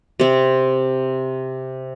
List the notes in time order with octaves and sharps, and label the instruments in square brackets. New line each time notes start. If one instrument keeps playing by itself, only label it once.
[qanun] C3 C4